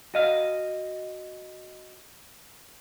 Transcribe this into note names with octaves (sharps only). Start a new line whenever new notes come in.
F#4 D#5 F5